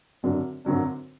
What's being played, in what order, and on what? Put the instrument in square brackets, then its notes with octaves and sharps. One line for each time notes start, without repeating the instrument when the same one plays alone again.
[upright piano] G#1 F#2 D3 F#3 D4
G#1 F#2 D3 F#3 D4